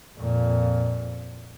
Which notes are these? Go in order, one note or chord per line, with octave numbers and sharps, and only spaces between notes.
F2 A#2